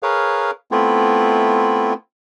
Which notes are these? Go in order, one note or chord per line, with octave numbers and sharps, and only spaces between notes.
G#4 A#4 B4 C#5 F5
A3 B3 C4 E4 F4